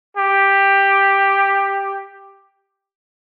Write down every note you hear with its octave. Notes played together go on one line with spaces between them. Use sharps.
G4